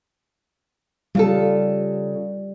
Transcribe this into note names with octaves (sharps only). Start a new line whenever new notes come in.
C#3 G3 F4 A4